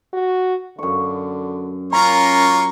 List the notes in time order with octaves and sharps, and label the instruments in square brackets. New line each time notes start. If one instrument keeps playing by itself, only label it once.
[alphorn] F#4
[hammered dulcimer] F#2 C#6 [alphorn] D3
[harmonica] A#3 F4 C#5 [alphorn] C#4 [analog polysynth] A#5 [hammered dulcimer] B5